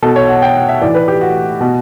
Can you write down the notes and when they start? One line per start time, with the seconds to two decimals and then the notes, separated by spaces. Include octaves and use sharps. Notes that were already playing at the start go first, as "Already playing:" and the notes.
0.02 B2 A4
0.16 C#5
0.29 F#5
0.42 G5
0.56 F#5
0.69 E5
0.81 A2 E3 D5
0.95 B4
1.08 G4
1.21 F#4
1.61 B2